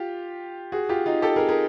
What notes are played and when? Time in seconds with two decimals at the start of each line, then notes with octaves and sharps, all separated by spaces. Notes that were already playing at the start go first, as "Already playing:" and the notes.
Already playing: F4 G4
0.72 F#4 G#4
0.89 F4 G4
1.06 D#4 F4
1.22 G4 A4
1.36 G#4 A#4
1.49 G#4 A#4